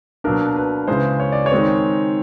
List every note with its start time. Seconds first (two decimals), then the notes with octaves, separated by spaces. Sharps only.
0.24 B2 F#3 A#3 D4 A#4
0.56 B4
0.88 C#3 E3 G#3 C5
1.20 C#5
1.32 D5
1.46 C#5
1.52 D#3 G#3 C4